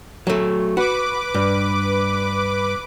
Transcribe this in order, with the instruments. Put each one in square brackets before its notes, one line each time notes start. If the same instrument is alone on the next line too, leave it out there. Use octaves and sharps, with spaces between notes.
[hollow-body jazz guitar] F#3 A3
[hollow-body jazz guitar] F#4 [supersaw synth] B4 D6
[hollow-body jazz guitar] G2